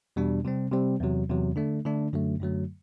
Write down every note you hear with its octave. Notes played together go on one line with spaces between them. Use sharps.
E2 B2 G3 D4
C3 G3 C4
C3 G3 C4
E2 C3 F#3
E2 C3 F#3
D3 A3 D4
D3 A3 D4
F#2 D3 F#3 A3
F#2 D3 F#3 A3